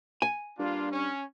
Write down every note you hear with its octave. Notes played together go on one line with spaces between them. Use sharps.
G#5
G2 A#3 D4 F4
C#4